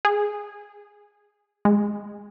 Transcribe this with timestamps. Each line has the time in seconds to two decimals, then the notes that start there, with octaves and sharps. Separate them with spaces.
0.05 G#4
1.65 G#3